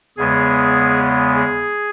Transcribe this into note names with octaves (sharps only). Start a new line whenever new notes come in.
E2 C#3 G#3 B3 G#4
G#4